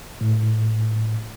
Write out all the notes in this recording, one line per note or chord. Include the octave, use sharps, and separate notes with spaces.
A2